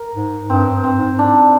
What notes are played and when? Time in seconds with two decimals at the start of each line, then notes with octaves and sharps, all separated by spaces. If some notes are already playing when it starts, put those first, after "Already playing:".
Already playing: A#4
0.14 G#2
0.49 G2 C4
0.73 G2
0.84 C4
0.96 G#2
1.19 G#2 D4